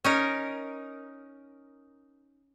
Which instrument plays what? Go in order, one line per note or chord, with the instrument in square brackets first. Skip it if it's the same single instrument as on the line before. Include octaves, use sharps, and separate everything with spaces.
[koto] C#4 D#4 A#4